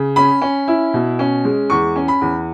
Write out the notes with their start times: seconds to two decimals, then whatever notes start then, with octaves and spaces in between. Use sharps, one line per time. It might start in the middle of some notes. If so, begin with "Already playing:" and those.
Already playing: C#3
0.16 C#4 B5
0.42 C#4
0.68 E4
0.94 B2
1.19 C#4
1.45 G#3
1.70 E2 C#6
1.96 C#4
2.08 B5
2.21 E2